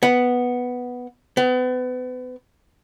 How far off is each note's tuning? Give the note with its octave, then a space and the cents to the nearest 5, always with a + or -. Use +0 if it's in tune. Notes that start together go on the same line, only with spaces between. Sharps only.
B3 +0
B3 +35